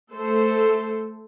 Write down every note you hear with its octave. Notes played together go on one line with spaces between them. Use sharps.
A3 A4 C5